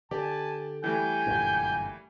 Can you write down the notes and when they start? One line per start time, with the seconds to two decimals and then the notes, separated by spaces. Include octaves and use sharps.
0.11 D3 G4 D5 G#5 A5
0.84 E3 G3 A3 G5 G#5
1.26 G1 F#2 A#2